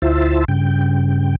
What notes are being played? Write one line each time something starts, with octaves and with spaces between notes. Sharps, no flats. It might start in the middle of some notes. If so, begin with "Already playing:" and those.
D2 E4 F4 C5 E5 A5
G2 C#3 G5